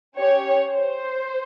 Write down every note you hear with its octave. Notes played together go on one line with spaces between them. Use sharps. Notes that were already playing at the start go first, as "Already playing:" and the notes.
C#4 G4 C#5
C5